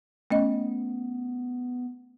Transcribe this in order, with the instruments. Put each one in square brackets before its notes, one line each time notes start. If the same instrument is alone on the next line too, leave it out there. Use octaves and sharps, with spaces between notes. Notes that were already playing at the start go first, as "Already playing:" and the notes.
[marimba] A3 C#4 D#5 [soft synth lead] B3